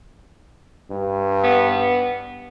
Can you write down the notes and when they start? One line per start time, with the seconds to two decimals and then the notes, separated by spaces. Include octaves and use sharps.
0.91 G2
1.44 B3